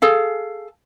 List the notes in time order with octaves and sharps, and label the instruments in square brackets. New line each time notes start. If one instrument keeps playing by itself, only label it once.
[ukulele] G#4 A4 F5